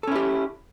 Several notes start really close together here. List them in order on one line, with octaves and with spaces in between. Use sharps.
A4 C#4 E4 G4